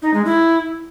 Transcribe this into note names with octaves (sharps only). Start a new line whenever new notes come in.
D#4
G#3
E4